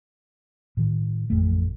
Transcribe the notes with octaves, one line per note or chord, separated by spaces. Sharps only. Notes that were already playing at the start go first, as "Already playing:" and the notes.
A2 D#3
A1 F2 A3